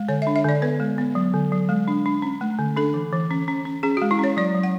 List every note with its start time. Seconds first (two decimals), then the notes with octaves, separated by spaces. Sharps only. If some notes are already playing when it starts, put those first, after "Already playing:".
Already playing: G#3
0.08 D3 C#5
0.22 E5
0.27 D4
0.36 E5
0.44 D3 D5
0.62 B3 B4
0.80 G#3
0.98 B3
1.15 F#3
1.34 D3
1.52 F#3
1.69 G#3
1.88 D4
2.06 D4
2.22 C#4
2.41 A3
2.59 D3
2.76 D4 A4
2.94 E3
3.13 E3
3.31 C#4
3.48 C#4
3.65 C#4
3.83 C#4 G#4
3.97 F#4
4.02 G#3
4.11 E4
4.19 C#4 C#5
4.37 F#3 D5
4.55 F#3
4.63 F#5